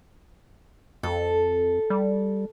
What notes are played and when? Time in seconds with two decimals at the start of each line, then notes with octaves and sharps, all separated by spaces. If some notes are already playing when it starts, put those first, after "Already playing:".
1.03 F2 A4
1.90 G3